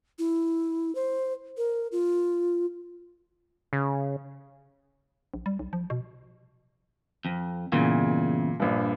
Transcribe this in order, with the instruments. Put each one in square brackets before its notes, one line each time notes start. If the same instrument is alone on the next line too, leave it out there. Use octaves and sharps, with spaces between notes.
[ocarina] E4
C5
A#4
F4
[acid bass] C#3
[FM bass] A#1
G3
B1
F3
B2
[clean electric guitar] F2
[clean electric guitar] E2 G2 C#3 [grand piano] A#2
[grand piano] A#1 G2